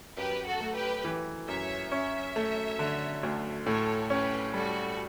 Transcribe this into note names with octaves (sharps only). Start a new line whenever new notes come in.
F#2 G4 B4
F#4 A4
A3
G4 B4
E3
F#2 C#5 E5
C#4 C#5 E5
A3
D3
D2
A2 A4 C#5
C#4 G4 B4
G3 F#4 A4